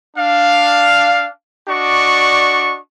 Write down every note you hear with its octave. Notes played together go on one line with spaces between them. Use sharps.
D4 F5
D4 F#4 D5 D#5 C#6